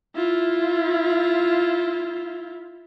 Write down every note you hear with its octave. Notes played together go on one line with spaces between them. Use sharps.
E4 F4